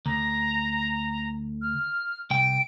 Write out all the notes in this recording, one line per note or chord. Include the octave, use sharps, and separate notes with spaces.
D2 A#5
F6
C2 G5 D7